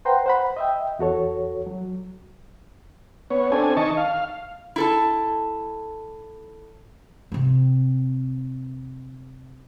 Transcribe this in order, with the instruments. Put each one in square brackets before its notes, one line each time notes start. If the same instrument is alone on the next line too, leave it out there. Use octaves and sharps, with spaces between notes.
[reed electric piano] B4 C5 F#5 G5 A#5 C6
C5 F#5 B5
D#5 E5 G5
E2 F#4 A4 C#5
F#3
[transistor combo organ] B3 C#5
C4 D4 A4 G#5
D#3 D#5 A5 C#6
F5
[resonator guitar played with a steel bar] E4 A4 A5
[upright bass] C3 C4